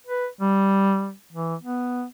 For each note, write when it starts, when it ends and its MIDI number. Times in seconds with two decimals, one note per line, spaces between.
0.07 0.27 71
0.41 1.13 55
1.32 1.55 52
1.62 2.04 59